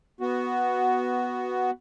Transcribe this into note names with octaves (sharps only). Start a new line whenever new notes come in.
B3 F#4